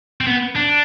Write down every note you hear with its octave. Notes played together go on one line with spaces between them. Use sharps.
C4
B3
D4